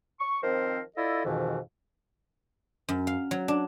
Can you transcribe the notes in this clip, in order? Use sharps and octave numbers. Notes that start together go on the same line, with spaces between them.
C#6
D#3 F3 C4 A#4 C5
E4 F4 A4 D5 D#5
F2 G#2 B2 D#3 E3
F#2
F5
F#3
D4